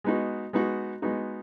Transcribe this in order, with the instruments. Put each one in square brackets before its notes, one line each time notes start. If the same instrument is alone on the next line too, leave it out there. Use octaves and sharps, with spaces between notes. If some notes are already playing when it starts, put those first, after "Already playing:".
[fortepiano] G#3 B3 D#4 F#4
G#3 B3 D#4 F#4
G#3 B3 D#4 F#4